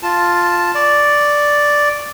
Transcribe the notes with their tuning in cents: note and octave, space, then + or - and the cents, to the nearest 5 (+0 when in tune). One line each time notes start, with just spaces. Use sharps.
F4 +0 A5 +0
D5 +0 C#6 +0